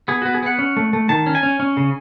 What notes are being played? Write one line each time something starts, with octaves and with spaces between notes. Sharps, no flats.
B3 G#4
B3 F#4
G#4
B3 F#5
C#4
A3
A3
D#3 A5
C#4
G#5
C#4
C#4
C#3